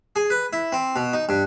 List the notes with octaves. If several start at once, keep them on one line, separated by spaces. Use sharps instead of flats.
G#4
B4
E4
C4
B2
D#4
G2